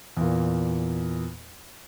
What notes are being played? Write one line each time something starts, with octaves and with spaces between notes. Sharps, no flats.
E2 A#2